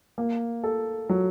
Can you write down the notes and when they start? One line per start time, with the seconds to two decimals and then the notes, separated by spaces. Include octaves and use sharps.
0.18 A#3
0.63 A4
1.09 F#3